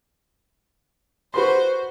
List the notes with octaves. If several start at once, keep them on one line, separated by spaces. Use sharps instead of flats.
F#4 B4 C5 C6